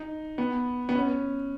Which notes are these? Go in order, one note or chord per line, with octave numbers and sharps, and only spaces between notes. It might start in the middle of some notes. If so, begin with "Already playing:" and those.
Already playing: D#4
B3
B3
C#4